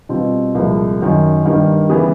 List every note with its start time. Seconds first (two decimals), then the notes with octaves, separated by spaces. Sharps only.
0.09 B2 G3 C4 F4
0.55 C2 A#2 F3 G#3
0.99 F#2 D#3 F#3
1.45 G2 D#3 G3 A#3
1.89 C#3 E3 G3 B3